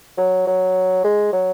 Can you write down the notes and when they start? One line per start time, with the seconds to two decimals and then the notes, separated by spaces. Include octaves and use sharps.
0.18 F#3
0.47 F#3
1.04 G#3
1.33 F#3